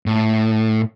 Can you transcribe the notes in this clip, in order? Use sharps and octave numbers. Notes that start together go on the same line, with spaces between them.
A2